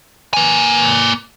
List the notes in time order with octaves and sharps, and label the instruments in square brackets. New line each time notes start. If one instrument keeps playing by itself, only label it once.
[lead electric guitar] A#3 G#5